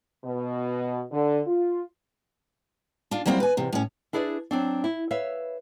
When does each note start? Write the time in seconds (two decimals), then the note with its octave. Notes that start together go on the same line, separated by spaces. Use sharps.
0.24 B2
1.10 D3
1.47 F4
3.11 D4 F4
3.26 F#3 G3 A#3 C4 E4
3.40 B4 G#5
3.57 E2 C3
3.73 A2 C#4
4.13 D4 E4 G#4 B4 C#5 D5
4.51 F#3 C4 D4
4.84 E4
5.11 B4 C#5 E5 F5